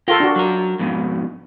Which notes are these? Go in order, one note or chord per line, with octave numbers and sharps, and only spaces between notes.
F4 A4 A#4 G5
D4 F#4
F#3 A#4
F2 G#2 B2